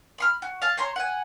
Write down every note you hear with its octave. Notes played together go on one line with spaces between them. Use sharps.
B5 C6 F6
F#4
F5 A5
C5 C#5 A#5 C6
F#5 G#5